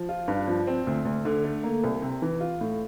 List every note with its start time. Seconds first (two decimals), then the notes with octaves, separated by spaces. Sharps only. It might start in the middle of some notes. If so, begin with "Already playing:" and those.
Already playing: F3
0.09 F4
0.28 G2
0.47 F3
0.67 C4
0.87 D2
1.05 D2
1.25 D3
1.44 A3
1.63 A#3
1.84 C2
2.02 C3
2.22 E3
2.41 F4
2.61 A2